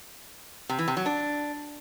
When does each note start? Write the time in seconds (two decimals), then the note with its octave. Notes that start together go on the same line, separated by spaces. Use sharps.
0.69 C3
0.79 E3
0.88 C3
0.97 F#3
1.06 D4